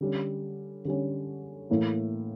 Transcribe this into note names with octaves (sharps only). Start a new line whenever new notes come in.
D3 G3 C#4
D3 G3 C#4
A2 E3 A#3 E4